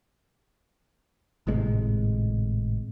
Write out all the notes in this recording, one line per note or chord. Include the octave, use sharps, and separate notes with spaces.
G#1 A2 C3 G#3